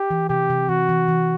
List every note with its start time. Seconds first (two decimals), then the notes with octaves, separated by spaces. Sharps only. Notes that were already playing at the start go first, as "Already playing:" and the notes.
Already playing: G4
0.10 E3
0.29 C3 G4
0.50 C3
0.69 E3 F#4
0.89 E3
1.08 E3